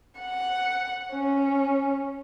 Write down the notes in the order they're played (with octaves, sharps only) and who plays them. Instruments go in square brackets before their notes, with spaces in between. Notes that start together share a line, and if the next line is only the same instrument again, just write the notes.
[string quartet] F#5
C#4